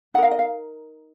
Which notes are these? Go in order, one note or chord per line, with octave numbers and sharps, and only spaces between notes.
D#4 A#4 F5 F#5
D#5
F5